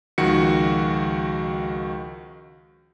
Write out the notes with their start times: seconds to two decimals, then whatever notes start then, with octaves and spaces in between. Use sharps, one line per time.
0.18 C#2 D#3 F3 F#4 C#7